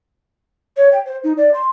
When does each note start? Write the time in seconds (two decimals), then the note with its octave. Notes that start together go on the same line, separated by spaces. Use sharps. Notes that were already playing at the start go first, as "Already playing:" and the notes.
0.77 C#5
0.92 G5
1.06 C5
1.24 D#4
1.37 D5
1.54 C6